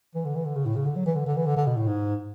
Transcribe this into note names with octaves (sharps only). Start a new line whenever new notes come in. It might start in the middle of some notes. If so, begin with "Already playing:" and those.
E3
D3
E3
D3
C#3
A2
C#3
D3
F#3
E3
D3
D3
E3
D3
D3
B2
A2
G#2